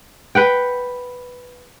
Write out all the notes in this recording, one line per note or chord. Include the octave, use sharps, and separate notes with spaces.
B4 F#5 G5